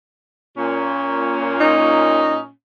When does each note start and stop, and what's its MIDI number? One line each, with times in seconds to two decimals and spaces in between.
0.57 2.49 46
0.57 2.49 61
1.60 2.38 63